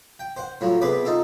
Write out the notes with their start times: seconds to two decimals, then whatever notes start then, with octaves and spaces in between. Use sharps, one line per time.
0.19 G5
0.37 C5 F#5
0.61 A2 F3 F#3
0.81 C3 B3 G#4 B4 B5 D6
1.05 D#4 F4 A4